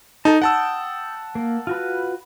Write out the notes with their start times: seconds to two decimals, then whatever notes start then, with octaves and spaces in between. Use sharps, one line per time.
0.25 D#4 A4 A5
0.42 F#5 G5 A5 D#6 E6
1.35 A#3
1.67 F4 F#4 B4